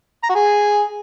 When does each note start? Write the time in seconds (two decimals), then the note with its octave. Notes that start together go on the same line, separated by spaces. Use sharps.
0.24 A#5
0.29 F#4
0.35 G#4